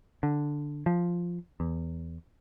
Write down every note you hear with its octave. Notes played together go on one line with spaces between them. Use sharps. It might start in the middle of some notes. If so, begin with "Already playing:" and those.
D3
F3
E2